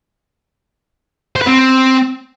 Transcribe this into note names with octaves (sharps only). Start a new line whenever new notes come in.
C5
B4
C4